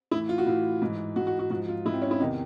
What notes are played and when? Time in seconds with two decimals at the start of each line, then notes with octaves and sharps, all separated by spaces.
0.11 A2 E3 E4
0.29 F4
0.38 F#4
0.46 A2 E3 F4
0.82 G#2 E3
1.16 G#2 E3 F#4
1.27 F#4
1.39 F#4
1.50 G#2 F3 F#4
1.68 F4
1.85 G#2 F3 E4
1.93 C4
2.02 C#4
2.11 E4
2.20 E2 C3 D#3 D#4